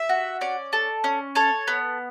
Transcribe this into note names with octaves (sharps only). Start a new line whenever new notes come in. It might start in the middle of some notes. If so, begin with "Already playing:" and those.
Already playing: E5
F#4
C#4 D5
A4
C#4
A4 C#5
B3